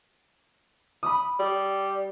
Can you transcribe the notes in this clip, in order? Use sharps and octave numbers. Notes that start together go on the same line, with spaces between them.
B5 D#6
G3